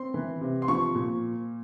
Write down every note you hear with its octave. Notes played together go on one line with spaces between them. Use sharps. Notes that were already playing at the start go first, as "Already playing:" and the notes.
Already playing: C4 C6
E3
C3
C6
F3 C#6
A#2